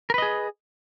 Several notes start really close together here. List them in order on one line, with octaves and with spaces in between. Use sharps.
A#4 B4 D#5 G#4